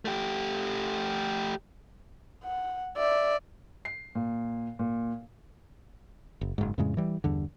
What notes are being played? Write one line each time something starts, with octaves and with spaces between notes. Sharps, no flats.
A3 G4
F#5
D5 E5
C7
A#2
A#2
F#1
F#1 G#2
F2 A2 C#3 G#3
E3 G3
E2 G2 D3